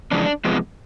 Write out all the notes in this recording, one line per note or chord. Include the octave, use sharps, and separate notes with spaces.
F2 C#3 E3 G#3 D4
C3 F3 G#3 B3